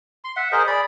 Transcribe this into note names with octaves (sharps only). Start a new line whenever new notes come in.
C6
E5 F#5
G#4 A#4 C5 D#5
G#4 D5 B5